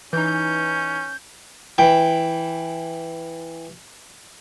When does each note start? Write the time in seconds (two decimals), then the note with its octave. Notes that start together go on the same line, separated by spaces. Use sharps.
0.13 E3 C#4 D#4 G6
1.78 E3 G5